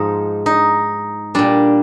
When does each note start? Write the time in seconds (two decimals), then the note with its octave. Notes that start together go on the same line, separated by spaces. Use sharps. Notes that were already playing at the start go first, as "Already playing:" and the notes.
Already playing: G#2 F3 G#3 D#4
0.46 D#4
1.35 A#2 G3 D4